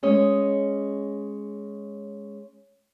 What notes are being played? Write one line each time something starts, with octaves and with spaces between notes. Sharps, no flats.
G#3 C#4 D#5